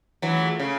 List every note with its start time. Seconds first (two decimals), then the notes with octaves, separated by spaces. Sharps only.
0.22 E3 F#3 A3 C#4 F4 G#4
0.60 C#3